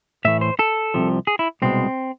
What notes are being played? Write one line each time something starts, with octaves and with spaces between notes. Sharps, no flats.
A2 E3 A3 E5
C5
A4
C2 C3 F3
G#4
E4
C2 B2 G#3 C4